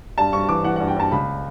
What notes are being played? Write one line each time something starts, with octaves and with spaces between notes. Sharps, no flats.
G2 A5
G2 C#6
E3 D6
E3 F#5
G2 F#5
G5
G2 A5
C#2 B5